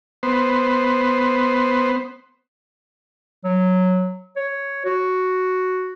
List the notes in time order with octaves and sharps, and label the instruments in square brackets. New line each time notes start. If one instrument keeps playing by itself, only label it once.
[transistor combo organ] B3 C5
[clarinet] F#3
C#5
F#4